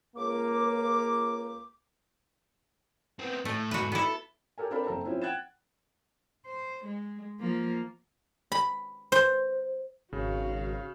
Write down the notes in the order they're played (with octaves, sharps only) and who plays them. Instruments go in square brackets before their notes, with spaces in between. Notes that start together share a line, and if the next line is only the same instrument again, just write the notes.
[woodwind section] C#2 D6 [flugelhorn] A#3
[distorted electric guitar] B3 C4
[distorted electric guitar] A2 [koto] A3
[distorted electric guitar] E2 G#2 [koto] F#4 B4
[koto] B3 E4 [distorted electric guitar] A4
[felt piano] G4 A4 A#4 G#5
C4 D4 A4 A#4 F5 B5
F#1 C4 A4 A5 A#5
F3 C4 C#4 E4
F#5 G5 F#6 G#6 A6 E7
[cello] C5
G#3
F3 A#3
[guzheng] B5
C5
[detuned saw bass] G#1 [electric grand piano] C#3 [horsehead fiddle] F#4 F5